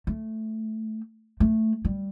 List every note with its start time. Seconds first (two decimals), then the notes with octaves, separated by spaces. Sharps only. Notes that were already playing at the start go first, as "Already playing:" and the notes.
0.07 A3
1.40 A3
1.85 G3